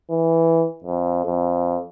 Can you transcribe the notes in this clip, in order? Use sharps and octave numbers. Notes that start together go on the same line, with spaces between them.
E3
F2
F2